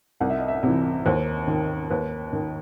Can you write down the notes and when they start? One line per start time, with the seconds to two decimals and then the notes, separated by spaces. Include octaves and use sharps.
0.20 C2 F#5
0.30 E5
0.39 D#5
0.48 E5
0.63 C3 E3
1.06 D#2 C5
1.47 D#3
1.90 D#2 B4
2.33 D#3